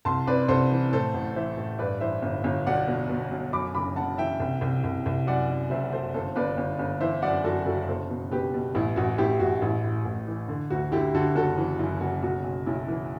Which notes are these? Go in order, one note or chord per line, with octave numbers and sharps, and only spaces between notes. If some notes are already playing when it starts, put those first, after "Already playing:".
C2 A5 C6
C3 B4 D5
C2 A4 C5
E3
A2 A4 C5
A1
E3 C5 E5
A1
G2 B4 D5
E3 C5 E5
G1
G1
B1 D5 F#5
B2
B2
B1
F#2 B5 D6
F#1 B5 D6
F#1 F#5 A5
E3 E5 G5
C2
C2
C2
C2
F#2 D5 F#5
F#2
F#1 C5 E5
F#1 A4 C5
G1 A4 C5
G1 B4 D5
G1
G1
E3 C5 E5
F#2 D5 F#5
F#2 F#4 A4
F#1 F#4 A4
B2 A4 C5
B2
B2 G4 B4
B2
A1 E4
A1 F#4
A1 E4 G4
A1 F#4
A1 E4
A2
A1
E3
D3
D2 F#4
D3 E4 G4
D3 F#4 A4
F#1 F#4 A4
E3
F#2 E4
F#1 F#4
B1 F#4
B1
B1 E4
E3